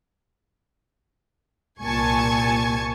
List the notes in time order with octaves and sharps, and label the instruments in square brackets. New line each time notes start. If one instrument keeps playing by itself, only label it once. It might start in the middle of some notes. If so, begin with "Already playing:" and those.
[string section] C2 A#2 G#5 A5 C#6 G#6